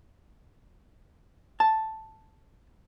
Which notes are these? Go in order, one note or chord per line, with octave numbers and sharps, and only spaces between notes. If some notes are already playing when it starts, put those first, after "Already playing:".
A5